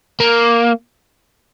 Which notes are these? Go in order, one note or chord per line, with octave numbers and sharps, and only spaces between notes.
A#3